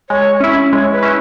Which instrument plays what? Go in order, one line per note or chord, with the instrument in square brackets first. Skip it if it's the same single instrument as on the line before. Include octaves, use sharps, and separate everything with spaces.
[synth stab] G#3 [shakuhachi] C#5
[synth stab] C#4 E4 [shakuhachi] E5
[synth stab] G#3 [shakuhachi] C#5
[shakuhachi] B4
[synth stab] C#4 E4